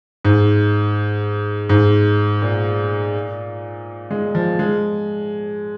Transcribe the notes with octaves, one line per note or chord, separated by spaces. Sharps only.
G#2
G#2
A#2
G#3
F3
G#3